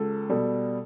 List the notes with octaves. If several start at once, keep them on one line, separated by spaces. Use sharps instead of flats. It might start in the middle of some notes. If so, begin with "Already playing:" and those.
Already playing: C#2 A4
B2 G3 A4